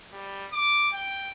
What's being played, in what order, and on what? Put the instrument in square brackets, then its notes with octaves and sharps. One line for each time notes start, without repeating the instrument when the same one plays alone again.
[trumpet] G3
D6
G5